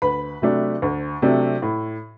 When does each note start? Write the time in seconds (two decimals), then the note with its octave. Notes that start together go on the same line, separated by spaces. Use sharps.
0.02 D2 B4 B5
0.42 C3 F#3 A3 D4
0.82 D2
1.22 C3 F#3 A3 D4
1.62 A2